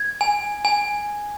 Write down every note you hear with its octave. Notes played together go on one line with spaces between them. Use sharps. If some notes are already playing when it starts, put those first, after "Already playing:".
Already playing: G#6
G#5
G#5